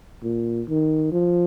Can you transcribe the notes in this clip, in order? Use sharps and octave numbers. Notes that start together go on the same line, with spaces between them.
A#2
D#3
F3